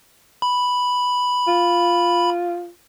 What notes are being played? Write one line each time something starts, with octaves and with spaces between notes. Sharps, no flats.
B5
F4